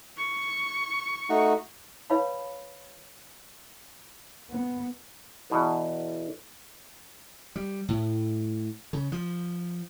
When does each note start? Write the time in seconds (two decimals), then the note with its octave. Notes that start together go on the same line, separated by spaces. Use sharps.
0.17 C#6
1.29 A3 D#4 F#4
2.10 B4 C#5 F5 A5 B5
4.51 B3
5.50 E2 B2 B3
7.56 G3
7.88 A2
8.93 C#3
9.12 F3